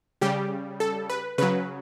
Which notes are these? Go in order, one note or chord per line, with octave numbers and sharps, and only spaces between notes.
C#3 G3 G4
A4
B4
C#3 F#3 B4